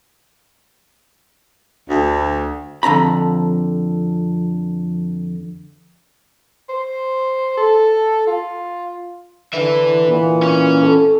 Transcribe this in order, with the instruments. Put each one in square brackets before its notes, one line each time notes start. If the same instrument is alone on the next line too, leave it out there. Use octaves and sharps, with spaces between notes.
[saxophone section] D2
[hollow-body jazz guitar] F2 D3 A#5 B5
[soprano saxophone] C5
A4
F4
[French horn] D3 [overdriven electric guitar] B4 E5
[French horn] A#2 [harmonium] E3 B3
[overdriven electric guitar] C#4 C#5
[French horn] A4